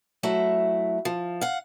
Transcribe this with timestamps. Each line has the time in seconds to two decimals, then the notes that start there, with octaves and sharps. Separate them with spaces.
0.23 F#3 A3 E4
1.05 F3
1.41 F5 F#5